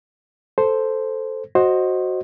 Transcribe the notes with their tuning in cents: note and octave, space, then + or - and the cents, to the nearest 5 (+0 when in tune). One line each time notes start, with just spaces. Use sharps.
A4 +0 C5 +0
F#4 +0 C5 +15 D#5 +0